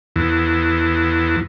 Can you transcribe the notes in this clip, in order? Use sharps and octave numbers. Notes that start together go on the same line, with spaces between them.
E2